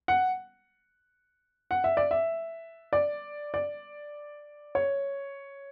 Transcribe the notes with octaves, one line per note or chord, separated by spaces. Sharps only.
F#5
F#5
E5
D5
E5
D5
D5
C#5